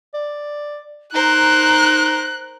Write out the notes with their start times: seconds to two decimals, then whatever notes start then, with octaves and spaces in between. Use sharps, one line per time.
0.14 D5
1.14 D#4 A#4 C5 F#6